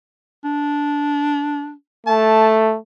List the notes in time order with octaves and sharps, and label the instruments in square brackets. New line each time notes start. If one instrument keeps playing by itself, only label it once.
[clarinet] D4
[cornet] A3 [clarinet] A5